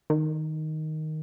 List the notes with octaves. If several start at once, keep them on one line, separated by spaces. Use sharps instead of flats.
D#3